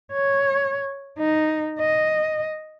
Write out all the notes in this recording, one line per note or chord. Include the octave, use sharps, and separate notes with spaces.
C#5
D#4
D#5